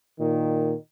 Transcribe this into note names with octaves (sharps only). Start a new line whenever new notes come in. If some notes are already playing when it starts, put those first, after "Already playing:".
A#2 D#3